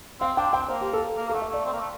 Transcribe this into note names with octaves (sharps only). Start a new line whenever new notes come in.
C4 F5
D4 G5
C4 G5
A#3 C5
G4
A4
A#3
A#3 A4
A3 F5
E5
A3 D5
C4
A#3
A3